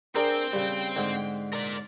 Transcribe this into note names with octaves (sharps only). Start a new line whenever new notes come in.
C4 D4 G#4 A#4 G5
C#3 G3
G#2 D3
A#4 D5